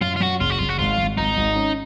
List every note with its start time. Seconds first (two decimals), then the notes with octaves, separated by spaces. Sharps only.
0.01 F#2 F4
0.16 F4
0.21 F#2 F#4
0.40 F#1 F4
0.50 F#4
0.59 F#1 F4
0.69 F#4
0.78 G#1 F4
0.97 G#1
1.17 G#1 D#4
1.37 G#1
1.56 C#4